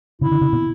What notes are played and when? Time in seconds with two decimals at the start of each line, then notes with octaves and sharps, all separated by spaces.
0.21 C#3 E4
0.31 D3
0.41 C#3
0.52 B2